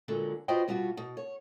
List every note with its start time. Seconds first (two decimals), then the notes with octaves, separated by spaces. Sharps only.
0.08 A#2 D3 F#3 G#3
0.48 F4 F#4 B4 C5 D#5 G5
0.68 B2 G3 F4 F#4
0.97 B2
1.17 C#5